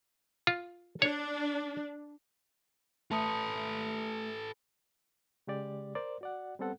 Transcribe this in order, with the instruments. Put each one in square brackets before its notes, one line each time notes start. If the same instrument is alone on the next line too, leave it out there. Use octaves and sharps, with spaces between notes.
[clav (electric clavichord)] F4
[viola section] D4 [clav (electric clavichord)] C#5
[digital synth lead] A3 [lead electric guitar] A4 B4 [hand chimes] A5 D#6 C#7
[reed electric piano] C#3 G#3 G4 D5
A#4 C5 D5
F#4 D5 F#5
G3 B3 C4 A4 F#5